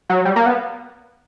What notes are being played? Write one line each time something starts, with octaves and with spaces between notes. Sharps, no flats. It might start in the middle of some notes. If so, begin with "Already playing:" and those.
F#3
G3
A#3
B3